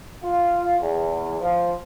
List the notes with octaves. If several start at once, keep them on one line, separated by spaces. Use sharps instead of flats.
F4
E2
F3